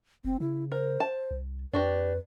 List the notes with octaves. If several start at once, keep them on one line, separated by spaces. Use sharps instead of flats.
F1 C4
C#3 E4
A#4 C5
A5
C2
F2 D4 F#4 G4 B4